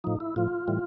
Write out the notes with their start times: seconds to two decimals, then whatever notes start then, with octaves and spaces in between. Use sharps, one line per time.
0.04 A2 F3 D#4
0.20 E4
0.36 A2 F3 F4
0.68 A2 E3 G3